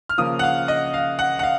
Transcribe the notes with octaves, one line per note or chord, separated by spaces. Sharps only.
F6
C#3 F3 A#3 D#6
F#5
F5
D#5
F5
F#5
F#5
F5